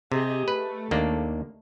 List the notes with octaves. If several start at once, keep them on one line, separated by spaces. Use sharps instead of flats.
C3 G4 G#4 D#5
A3 B4
D#2 A#3 D4